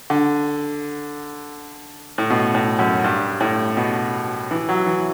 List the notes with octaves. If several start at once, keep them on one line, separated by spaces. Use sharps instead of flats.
D3
A2
B2
A2
F#2
G2
A2
B2
E3
F#3
E3